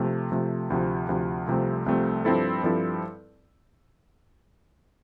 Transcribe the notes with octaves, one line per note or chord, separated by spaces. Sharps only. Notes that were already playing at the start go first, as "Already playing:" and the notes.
Already playing: C3 F3 A3
C3 F3 A3
D2 C3 F3
D2 C3 F3
C2 C3 F3 A3 C4
C2 C3 F3 A3 C4
G2 F3 C4 E4 A4
G2 F3 C4 E4 A4